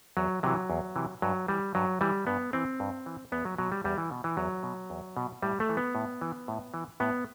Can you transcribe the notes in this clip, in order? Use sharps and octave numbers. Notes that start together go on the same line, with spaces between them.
E2 F#3
C3 E3 F#3
E2
C3 E3
G2 F#3
E3 G3
G2 F#3
E3 G3
G2 B3
E3 C4
G2
E3
E2 B3
F#3
B2 F#3
G3
E2 G3
E3
B2
E3
E2 F#3
B2
E2
B2
A2 G3
A3
E3
B3
A2
E3
A2
E3
A2 B3